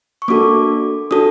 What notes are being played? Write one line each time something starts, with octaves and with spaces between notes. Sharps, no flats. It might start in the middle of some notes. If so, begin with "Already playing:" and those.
C#6
A#3 D4 F#4 A4 D6
D4 F#4 A4 D#6